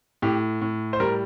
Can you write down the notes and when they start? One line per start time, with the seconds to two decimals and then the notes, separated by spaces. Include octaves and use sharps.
0.22 A2 G4
0.62 A2
0.93 C5
1.00 G3 A#4